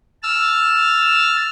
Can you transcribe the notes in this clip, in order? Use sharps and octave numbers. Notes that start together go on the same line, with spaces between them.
A5 E6 F6